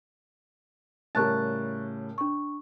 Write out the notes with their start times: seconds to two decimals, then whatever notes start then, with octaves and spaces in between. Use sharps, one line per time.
1.15 A2 C#3 G3 A#4 A5 C#6 F#6 A6
2.18 D4 C#6